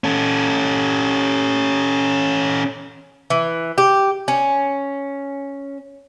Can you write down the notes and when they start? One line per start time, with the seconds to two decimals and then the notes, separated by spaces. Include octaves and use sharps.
0.04 C#4 A4
3.30 E3
3.78 G4
4.28 C#4